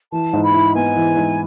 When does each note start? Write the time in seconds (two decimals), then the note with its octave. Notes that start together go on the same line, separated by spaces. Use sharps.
0.12 E3 A5
0.33 G#2
0.43 B5
0.53 E4
0.75 B3 G#5
0.96 E3
1.17 G#2